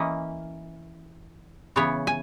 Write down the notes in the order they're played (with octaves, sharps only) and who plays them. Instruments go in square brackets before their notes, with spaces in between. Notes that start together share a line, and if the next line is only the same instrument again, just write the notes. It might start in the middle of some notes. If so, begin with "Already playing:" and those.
Already playing: [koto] E3 A#3 C#4 D#5
C#3 E3 B3 C#5
G#5